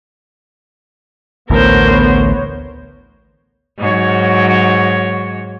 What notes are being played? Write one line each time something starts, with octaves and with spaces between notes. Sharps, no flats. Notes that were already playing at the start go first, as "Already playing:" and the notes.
A1 D2 A2 B3 A#4 C5 C#5
G#2 F#3 C#5